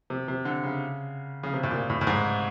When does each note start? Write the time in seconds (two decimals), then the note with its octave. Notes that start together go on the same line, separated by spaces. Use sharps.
0.10 C3
0.28 C3
0.45 D3
0.64 C#3
1.43 C#3
1.54 C3
1.63 A2
1.71 A#2
1.90 A2
2.01 A2
2.07 G#2